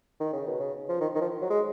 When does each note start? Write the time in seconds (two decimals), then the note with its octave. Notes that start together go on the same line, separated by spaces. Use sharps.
0.20 D#3
0.33 C#3
0.47 B2
0.60 C#3
0.89 F3
1.01 D#3
1.15 D#3
1.21 F3
1.41 F#3
1.50 G#3